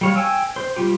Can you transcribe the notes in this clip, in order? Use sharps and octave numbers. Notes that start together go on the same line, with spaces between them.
G3 C#5 F5
G5 G#5 E6
C5
G3 F4 G4